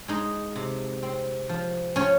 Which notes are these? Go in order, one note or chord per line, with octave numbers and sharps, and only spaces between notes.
G#3 D#4 D#5
C3
C4
F3
F3 C#4 C#5